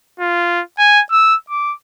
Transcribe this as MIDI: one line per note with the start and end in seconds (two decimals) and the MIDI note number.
0.20 0.62 65
0.79 1.01 80
1.11 1.35 88
1.50 1.73 86